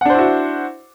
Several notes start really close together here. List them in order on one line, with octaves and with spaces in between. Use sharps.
F#5 D4 C5 E4 F#4